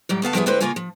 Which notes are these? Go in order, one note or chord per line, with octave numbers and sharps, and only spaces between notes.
A2 F#3 G3
D2 B3 F5 A5
F3 G3 B3 E4 G4 G#4
D3 G#3 C4 E4 B4 C5
C#3 A#3 F4 G#4 C#5 G#5
F3